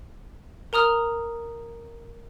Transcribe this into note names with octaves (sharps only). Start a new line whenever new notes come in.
A#4 A#5 D#6 F6